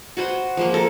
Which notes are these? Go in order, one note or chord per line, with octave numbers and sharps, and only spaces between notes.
F#4 B4 C5 F#5
F3 G#3 A#3
A4 A#4